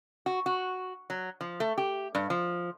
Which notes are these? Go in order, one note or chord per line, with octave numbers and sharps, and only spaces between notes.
F#4
F#4
F#3
F3
A3
G4
G2
F3